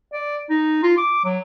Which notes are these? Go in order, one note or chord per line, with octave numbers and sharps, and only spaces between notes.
D5
D#4
F4
D6
F#3